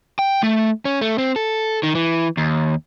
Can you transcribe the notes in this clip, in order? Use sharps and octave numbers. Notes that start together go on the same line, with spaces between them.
G5
A3
C#4
A3
C4
A4
D#3
E3
D#2